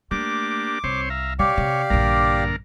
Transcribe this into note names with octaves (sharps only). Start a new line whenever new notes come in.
A3 A#3 D4 G4 D6
C2 C4 C5 C#5
E5 F5 A#5
C3 G4 C#5 D5 F5
C3
A#1 G2 D3 A#3 A#4